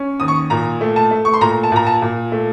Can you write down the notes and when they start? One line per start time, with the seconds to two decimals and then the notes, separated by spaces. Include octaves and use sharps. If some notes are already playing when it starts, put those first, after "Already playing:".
Already playing: C#4
0.20 D#2 D#6
0.28 C#6
0.50 A#2 A#5
0.81 A3
0.96 A5
1.11 A3
1.25 C#6
1.34 C6
1.41 A#2 A#5
1.63 A5
1.72 A#2 A#5
1.87 A5
2.02 A#2
2.32 A3